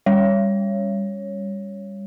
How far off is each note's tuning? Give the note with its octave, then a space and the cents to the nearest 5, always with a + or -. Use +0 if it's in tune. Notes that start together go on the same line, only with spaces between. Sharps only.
G3 +25 C#5 +0